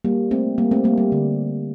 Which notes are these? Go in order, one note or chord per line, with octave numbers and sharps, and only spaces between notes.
G3 A#3
A3 C4
G3 A#3
A3 C4
G3 A#3
G3
D3